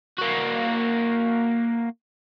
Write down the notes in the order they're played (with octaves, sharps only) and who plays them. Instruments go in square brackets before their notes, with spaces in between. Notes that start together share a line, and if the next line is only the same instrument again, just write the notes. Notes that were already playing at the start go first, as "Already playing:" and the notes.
[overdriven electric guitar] A#3 F#4